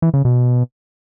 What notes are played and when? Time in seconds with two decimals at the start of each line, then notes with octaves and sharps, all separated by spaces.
0.02 E3
0.14 C#3
0.25 B2